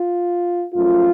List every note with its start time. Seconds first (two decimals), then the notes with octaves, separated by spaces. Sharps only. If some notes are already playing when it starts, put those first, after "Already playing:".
Already playing: F4
0.75 F#2 F3 A3 C#4 F4